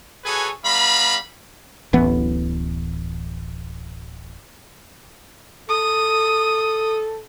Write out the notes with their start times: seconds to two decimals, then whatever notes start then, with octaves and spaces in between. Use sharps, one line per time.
0.25 F#4 G#4 A4 B4 C#5 G#5
0.64 G3 B3 F5 A#5 B5
1.93 D1 A1 E3 B3
5.69 A4 D#6